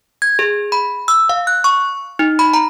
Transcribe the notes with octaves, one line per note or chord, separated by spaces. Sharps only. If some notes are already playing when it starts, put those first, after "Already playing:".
G#6
G#4
B5
E6
F5
F#6
C#6
D#4
B5
A#5